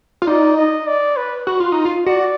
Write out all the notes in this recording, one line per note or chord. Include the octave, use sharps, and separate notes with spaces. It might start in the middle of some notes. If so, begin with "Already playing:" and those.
F4
D#4 D5
D#5
D5
B4
F#4
F4
D#4
F4
F#4 D5